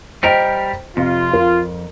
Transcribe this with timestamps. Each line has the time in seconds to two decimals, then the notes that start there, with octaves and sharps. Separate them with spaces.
0.23 G3 G4 A#4 C5 D#5 G5
0.97 F2 C3 F4
1.33 A#4